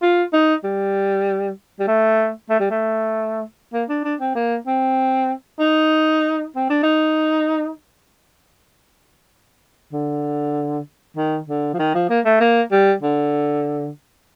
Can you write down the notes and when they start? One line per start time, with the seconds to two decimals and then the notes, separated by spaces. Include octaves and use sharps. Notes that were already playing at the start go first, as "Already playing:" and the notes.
0.02 F4
0.33 D#4
0.64 G3
1.80 G3
1.87 A3
2.50 A3
2.60 G3
2.70 A3
3.73 A#3
3.89 D4
4.04 D4
4.20 C4
4.35 A#3
4.67 C4
5.59 D#4
6.56 C4
6.70 D4
6.83 D#4
9.93 D3
11.17 D#3
11.47 D3
11.74 F3
11.79 D#3
11.95 F3
12.10 A#3
12.25 A3
12.41 A#3
12.72 G3
13.02 D3